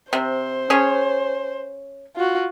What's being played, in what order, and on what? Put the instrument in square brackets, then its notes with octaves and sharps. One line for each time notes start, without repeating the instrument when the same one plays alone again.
[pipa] C3 [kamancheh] C5
[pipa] C#4 G#4 C#5
[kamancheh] F4 F#4